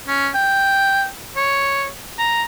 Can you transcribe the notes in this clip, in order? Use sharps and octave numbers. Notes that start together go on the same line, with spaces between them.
C#4
G5
C#5
A#5